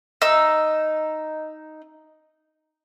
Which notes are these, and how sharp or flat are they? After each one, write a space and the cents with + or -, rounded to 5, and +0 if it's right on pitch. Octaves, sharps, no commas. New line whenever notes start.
D#4 +0 E6 +0